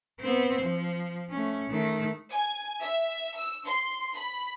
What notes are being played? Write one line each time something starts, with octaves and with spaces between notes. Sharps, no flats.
B3 C4
F3
A3 C#4
D#3 A3
G#5
E5
E6
C6
B5